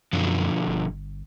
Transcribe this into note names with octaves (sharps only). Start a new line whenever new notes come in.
F#2 B2 D3 F3
G1